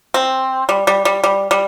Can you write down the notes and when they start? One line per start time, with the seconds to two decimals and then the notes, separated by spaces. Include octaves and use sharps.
0.14 C4
0.69 G3
0.87 G3
1.05 G3
1.24 G3
1.51 G3